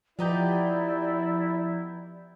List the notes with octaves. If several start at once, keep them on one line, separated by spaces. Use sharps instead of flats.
F3 B3 D#4 E4 G4 D5 A#5 G6